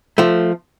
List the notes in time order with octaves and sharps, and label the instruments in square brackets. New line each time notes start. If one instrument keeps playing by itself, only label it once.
[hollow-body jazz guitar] F3 A3